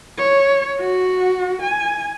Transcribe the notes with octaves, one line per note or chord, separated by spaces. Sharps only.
C#5
F#4
G#5